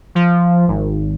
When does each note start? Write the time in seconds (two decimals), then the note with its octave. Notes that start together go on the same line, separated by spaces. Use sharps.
0.15 F3
0.68 G#1